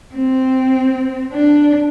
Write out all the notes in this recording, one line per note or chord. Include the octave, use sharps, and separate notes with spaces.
C4
D4